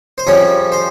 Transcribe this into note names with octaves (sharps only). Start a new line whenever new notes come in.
C5
F2 C#3 G3 C#5
C5